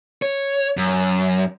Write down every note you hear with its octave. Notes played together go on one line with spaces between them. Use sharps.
C#5
F#2